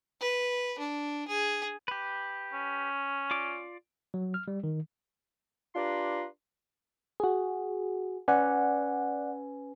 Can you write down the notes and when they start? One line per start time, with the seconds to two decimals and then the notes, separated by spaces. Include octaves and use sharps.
0.21 B4
0.79 D4
1.28 G#4
1.88 G4 B4
2.53 C#4
3.31 F4 D5 D6
4.14 F#3
4.34 F6
4.48 G3
4.64 D#3
5.75 D4 F4 G4 B4 A#5 C6
7.20 F#4 G#4
8.28 C#4 B4 D5 F#5 G#5